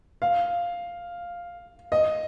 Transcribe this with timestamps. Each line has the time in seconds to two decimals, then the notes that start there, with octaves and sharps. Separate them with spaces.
0.22 F5
1.92 D#5